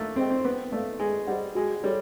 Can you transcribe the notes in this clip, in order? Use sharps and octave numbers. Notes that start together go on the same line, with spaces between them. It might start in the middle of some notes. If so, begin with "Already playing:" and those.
Already playing: A3 A#3
C4 G#4 C5 D#5 G5
C4
B3 B4
A3 D5 F5
G#3 G#4
G3 C5 D#5 F#5
G#3 F#4
G3 A4 C#5